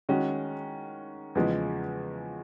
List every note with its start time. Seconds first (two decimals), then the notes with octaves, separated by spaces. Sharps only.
0.09 D#3 G#3 C#4 F#4
1.35 E2 C#3 F3 G#3